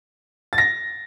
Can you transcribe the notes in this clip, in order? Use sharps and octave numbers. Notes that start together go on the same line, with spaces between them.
A6
A#6